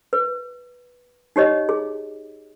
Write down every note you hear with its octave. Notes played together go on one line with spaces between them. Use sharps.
B4
D#4 G4 C#5 D#5
G#4